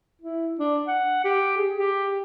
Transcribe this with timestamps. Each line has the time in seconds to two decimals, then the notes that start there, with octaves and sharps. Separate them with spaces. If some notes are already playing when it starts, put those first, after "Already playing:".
0.21 E4
0.59 D4
0.88 F#5
1.25 G4
1.57 G#4
1.78 G4